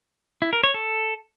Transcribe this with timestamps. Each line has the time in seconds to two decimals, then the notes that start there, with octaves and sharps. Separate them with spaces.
0.42 E4
0.53 A#4
0.64 C#5
0.74 A4